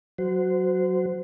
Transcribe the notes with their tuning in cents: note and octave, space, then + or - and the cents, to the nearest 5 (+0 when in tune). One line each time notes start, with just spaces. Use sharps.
F#3 +0 F#4 +0 C5 -25